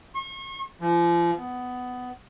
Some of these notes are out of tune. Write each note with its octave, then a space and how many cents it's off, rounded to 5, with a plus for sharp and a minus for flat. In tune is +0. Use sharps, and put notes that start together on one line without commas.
C#6 -40
F3 -35
B3 +15